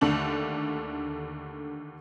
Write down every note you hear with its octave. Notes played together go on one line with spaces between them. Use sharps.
D#2 D3 A3 D4 F#7